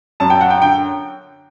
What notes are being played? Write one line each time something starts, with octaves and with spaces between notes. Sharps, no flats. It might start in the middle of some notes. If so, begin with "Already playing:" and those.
F#2 A5
G5
F#5
G5
D3 G5